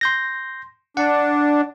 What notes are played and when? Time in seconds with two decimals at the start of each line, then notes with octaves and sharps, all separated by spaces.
0.01 C6 G6 A#6
0.97 D4 F#5 A5